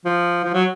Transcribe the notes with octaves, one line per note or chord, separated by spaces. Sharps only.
F3
F3
F#3